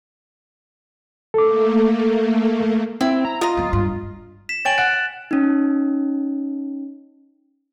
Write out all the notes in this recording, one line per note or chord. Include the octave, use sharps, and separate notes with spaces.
A3 A#3 A4 D6
C4 E4
A#5
F4 D#5 A#5
F#3 B3
G2
B6 E7
C#5 G5 G#5 A6 D7 F#7
F#5 F#6 D7
C#4 D#4